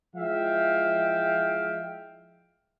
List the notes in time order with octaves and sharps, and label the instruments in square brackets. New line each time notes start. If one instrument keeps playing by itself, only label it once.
[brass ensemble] F3 G#3 E4 E5 F5 G5